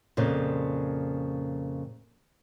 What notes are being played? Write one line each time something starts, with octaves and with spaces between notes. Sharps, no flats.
F2 A#2 C#3